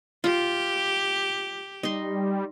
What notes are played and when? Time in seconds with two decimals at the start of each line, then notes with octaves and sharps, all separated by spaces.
0.24 F4 G4
1.83 G3 D#4 C6